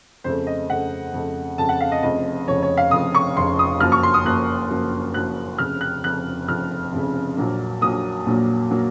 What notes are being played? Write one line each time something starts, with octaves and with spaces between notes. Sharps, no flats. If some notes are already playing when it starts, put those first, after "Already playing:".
F2 C#3 A3 C5
D#5
F2 C#3 A3 F#5
F2 C#3 A3
F2 C#3 A3 A5
F#5
F5
D#5
F1 F2 C#3 D#5
F1 F2 C#3 C#5
C#5
F5
F1 F2 C#3 D#6
C#6
F1 F2 C#3 C6
D#6
F#1 F#2 F3 A#3 F6
C#6
C6
D#6
F#1 F#2 F3 A#3 F#6
F#1 F#2 F3 A#3
F#1 F#2 F3 A#3 F#6
F1 F2 C#3 F6
F#6
F1 F2 C#3 F#6
F1 F2 C#3 F6
F1 F2 C#3
A#1 A#2 F#3 A#3
A#1 A#2 F#3 A#3 D#6
A#1 A#2 F#3 A#3
A#2 F#3 A#3